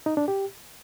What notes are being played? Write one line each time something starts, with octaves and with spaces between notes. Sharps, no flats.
D#4
D4
G4